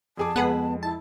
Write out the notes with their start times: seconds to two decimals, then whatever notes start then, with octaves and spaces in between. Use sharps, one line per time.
0.17 F2 G#4 A5 D6
0.36 F2 G#3 B3 G#4 B4 F#5
0.83 E4 A5